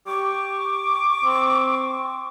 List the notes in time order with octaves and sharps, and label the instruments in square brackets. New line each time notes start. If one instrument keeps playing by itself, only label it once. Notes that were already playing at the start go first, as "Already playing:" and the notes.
[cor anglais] G4 [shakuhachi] C#6 [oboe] D6
[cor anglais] C4